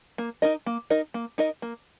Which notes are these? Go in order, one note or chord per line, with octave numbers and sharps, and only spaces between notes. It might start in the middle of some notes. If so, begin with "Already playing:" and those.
A#3
D#4 A#4 D#5
A#3
D#4 A#4 D#5
A#3
D#4 A#4 D#5
A#3